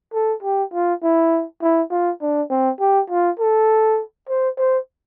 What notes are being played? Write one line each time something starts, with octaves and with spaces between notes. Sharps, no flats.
A4
G4
F4
E4
E4
F4
D4
C4
G4
F4
A4
C5
C5